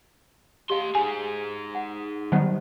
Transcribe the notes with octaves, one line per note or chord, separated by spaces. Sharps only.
A3 G4 D#5 F5 C6
D#4 G#4 G#5
F#5
D#3 F#3 G3 B3 C5 F#5 A5